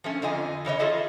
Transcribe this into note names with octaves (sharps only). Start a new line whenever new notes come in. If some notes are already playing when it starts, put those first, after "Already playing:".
F3 A3 C#4
F2 D3 F4 D#5 G#5
C#3 E3 C#5 D#5
F4 G#4 A4 D#5 E5